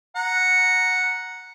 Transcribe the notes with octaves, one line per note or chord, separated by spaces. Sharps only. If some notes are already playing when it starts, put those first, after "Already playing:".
F#5 A#5